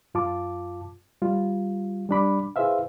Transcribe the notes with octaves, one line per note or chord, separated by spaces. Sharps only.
F#2 F4 A5 D6
G3 F4
G3 D4 B5 D6
E4 G#4 B4 C5 E5 F5